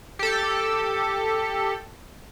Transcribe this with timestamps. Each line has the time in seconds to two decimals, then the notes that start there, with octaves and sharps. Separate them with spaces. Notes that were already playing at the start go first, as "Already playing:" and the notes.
0.19 G4 A4